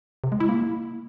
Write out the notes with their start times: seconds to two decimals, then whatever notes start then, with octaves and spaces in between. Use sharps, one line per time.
0.24 C3
0.32 G#3
0.40 E4
0.49 A#3